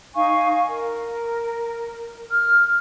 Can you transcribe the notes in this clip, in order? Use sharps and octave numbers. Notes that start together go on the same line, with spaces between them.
D#4 F5 G#5 C#6
A#4
F6